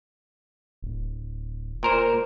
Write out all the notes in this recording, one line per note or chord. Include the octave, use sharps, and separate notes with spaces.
D1
A#2 A#4 C5